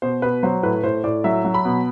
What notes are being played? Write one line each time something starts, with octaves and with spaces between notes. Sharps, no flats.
B2 C5
B2 B4
F#3 C5
A2 B4
A2 C5
A2 D5
F#3 E5
F#3
B5
B2